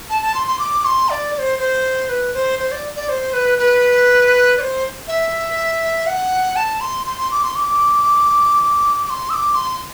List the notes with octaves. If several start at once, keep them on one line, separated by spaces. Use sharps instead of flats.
A5
A5
C6
C6
D6
C6
D5
D5
C5
C5
B4
C5
C5
D5
D5
C5
B4
B4
D5
C5
E5
F#5
A5
C6
C6
C6
D6
C6
D6
D6
C6
E6
D6
C6